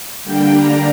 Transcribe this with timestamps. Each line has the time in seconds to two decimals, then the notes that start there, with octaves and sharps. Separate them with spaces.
0.24 D3 G3 A#3 D4 G5
0.53 A#5